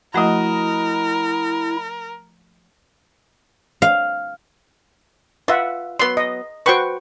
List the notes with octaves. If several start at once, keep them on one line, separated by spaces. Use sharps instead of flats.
F3 A3 E4 F#4 A#4 D#5
F5
F4 B4 E5 F#5
F#3 B3 C6
D#5
F#4 B4 C5 G5 C#6